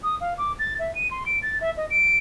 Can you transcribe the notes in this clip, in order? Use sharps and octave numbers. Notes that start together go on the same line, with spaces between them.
D#6
F5
D6
A6
E5
D#7
C6
D7
A6
E5
D#5
D7